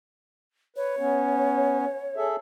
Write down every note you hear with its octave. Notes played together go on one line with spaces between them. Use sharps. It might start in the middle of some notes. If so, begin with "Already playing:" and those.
B4 C#5
B3 C#4
G#4 A4 E5